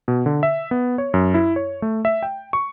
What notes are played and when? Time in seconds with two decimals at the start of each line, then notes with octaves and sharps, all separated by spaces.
0.08 B2
0.26 D3
0.43 E5
0.71 B3
0.98 C#5
1.14 F#2
1.34 E4
1.56 C#5
1.82 A3
2.05 E5
2.23 G5
2.53 C#6